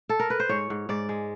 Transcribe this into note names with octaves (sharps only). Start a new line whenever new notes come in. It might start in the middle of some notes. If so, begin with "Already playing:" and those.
A4
A#4
B4
C5
G#2 C#5
G#2
G#2 D5
G#3